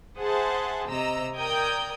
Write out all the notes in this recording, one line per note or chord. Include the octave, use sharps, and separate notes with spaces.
G#4 C5 E5 F#5 A5
C3 D#5 A#5 E6
A#4 D5 G5 D#6 G6 G#6